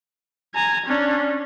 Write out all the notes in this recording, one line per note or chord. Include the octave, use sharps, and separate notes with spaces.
G#5 A#5
C#4 D4